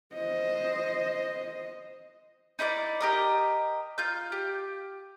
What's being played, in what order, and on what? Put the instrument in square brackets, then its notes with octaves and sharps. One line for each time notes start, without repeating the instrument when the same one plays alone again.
[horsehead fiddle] C5 D#5
[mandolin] D#4 E4 C5 D5
G4 A#4 D#5
F4 G6
G4